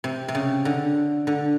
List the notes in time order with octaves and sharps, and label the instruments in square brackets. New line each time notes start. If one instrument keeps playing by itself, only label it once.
[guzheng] C3
C3
C#3
D3
D3